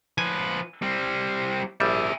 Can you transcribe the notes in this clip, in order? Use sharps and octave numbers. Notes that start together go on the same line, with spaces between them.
F3 B4 G#5
G3 C4
A#1 G3 G#4 E5